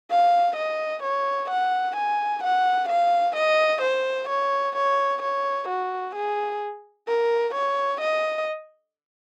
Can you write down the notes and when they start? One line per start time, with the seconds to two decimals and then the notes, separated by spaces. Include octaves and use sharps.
0.11 F5
0.57 D#5
1.03 C#5
1.50 F#5
1.96 G#5
2.44 F#5
2.89 F5
3.36 D#5
3.82 C5
4.29 C#5
4.76 C#5
5.22 C#5
5.68 F#4
6.15 G#4
7.08 A#4
7.54 C#5
8.01 D#5